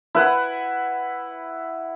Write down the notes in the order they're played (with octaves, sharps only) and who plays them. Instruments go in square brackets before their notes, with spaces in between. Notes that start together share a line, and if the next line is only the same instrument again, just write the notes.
[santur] E4 B4 F#5